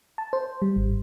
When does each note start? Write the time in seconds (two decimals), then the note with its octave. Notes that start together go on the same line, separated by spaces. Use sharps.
0.18 A5
0.33 C5
0.62 G3
0.76 G#1